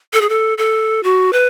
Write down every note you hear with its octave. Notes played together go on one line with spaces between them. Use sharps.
A4
G#4
A4
A4
F#4
B4